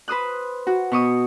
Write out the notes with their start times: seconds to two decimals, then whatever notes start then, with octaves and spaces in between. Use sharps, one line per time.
0.08 B4 C5 D#6 F#6
0.67 F#4
0.92 B2 C#6 D#6